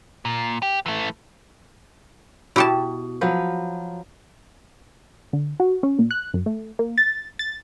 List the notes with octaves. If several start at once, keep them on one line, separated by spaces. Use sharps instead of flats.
A#2
G4
E3 A3
B2 E4 G4 A5
F3 F#3 B4
D3
F#4
C#4
A#2
F#6
F#2
A3
A#3
A6
A6